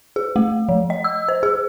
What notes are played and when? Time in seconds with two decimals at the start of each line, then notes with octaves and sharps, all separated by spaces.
0.16 G#4
0.36 A3
0.69 F3
0.90 D#5
1.04 E6
1.29 C5
1.43 G#4